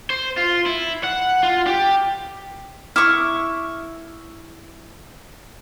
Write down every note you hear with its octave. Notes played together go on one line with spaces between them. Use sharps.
C5
F4
E4
F#5
F4
G4
E4 C#6 D6 F6